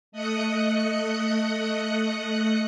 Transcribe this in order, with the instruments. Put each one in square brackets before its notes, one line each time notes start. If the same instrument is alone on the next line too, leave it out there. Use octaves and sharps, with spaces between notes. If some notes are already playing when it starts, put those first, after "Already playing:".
[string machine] A3 D#5 D#6 F#6 C#7